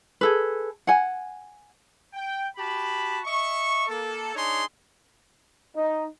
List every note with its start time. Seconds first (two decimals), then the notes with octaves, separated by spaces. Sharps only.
0.21 G#4 A4 B4
0.87 F#5 G#5
2.14 G5
2.57 F#4 G4 A5 B5
3.25 D#5 E5 C#6
3.88 A#3 A4
4.35 D4 D#4 G#4 C#5 C6
5.76 D#4